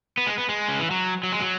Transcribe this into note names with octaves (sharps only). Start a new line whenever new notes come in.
B3
G#3
B3
G#3
C#3
E3
F#3
F#3
G#3
F#3